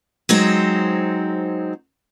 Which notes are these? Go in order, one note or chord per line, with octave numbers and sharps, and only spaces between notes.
F#3 G#3 C4 D#4 C5